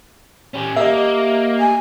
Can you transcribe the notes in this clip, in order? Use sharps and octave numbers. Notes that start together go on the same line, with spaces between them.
C#4 G4
A#3 G4 D#5 E5
G#5